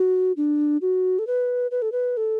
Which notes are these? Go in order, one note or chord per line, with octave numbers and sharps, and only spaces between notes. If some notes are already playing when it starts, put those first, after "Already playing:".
Already playing: F#4
D4
F#4
A4
B4
B4
A4
B4
A4